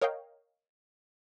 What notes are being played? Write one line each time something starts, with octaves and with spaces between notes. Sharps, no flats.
A#4 C#5 D#5 F5 G5